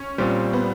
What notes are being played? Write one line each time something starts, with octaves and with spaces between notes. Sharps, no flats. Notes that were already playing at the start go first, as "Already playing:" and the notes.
Already playing: C#4
A#2 G3 C4
B3